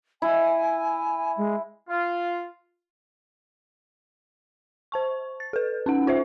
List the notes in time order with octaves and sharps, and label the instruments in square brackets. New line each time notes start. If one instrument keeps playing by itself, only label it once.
[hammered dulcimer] E4 [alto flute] G#5
[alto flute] G#3
[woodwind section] F4
[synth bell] C5 A5 C#6
A6
A4 B4
C#4 D#4 F#5
F4 C5 E5